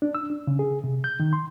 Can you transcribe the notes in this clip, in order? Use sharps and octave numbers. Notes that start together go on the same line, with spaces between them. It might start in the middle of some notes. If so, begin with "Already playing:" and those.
D4
E6
D4
C#3
G#4
C3
G6
D#3
C6